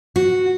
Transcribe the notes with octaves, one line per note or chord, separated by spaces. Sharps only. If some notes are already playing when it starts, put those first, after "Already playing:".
F#4